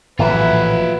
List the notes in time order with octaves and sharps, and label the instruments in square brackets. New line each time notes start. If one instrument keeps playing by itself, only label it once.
[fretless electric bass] A#1 [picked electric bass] A2 E3 F#3 [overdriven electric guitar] F4 E5 [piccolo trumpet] B4